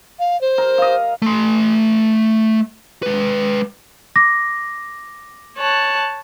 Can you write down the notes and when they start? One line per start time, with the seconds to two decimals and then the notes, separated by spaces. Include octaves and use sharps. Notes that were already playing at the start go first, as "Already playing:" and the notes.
0.19 F5
0.41 C5
0.58 A#4
0.78 D#5 F5
1.22 A3 C6
3.03 G#3 B4
4.16 D6 A#6
5.58 C#5 A5 F#6